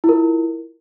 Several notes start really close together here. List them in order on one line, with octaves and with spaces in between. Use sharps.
E4 F4 A#4